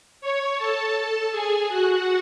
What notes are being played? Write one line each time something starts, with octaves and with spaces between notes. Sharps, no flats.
C#5 C#6
A4 A5
G#4 G#5
F#4 F#5